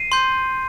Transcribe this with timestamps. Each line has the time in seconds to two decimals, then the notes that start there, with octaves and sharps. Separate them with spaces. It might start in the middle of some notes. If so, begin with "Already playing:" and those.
Already playing: C7 D#7
0.12 C6 G6